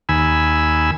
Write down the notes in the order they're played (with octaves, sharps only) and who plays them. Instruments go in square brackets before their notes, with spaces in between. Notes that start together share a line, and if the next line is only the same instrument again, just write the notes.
[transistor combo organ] D#2 G#5 B5 E6